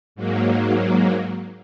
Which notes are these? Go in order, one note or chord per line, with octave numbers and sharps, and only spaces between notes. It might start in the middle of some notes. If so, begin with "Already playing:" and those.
G#2 F#3 A#3